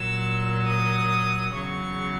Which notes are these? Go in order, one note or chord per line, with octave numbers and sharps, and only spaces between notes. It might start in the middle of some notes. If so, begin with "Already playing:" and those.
Already playing: A#2 F#3 E6
D#6
E2 C#3 F#3 C#6